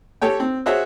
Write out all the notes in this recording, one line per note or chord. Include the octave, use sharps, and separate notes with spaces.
G4 A4 C#5 G5
C4
F#4 G#4 C5 C#5 E5 F#5